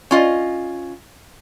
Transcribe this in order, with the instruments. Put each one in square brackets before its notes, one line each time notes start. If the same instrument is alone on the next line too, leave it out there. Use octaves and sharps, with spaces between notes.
[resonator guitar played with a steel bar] C#4 F4 D#5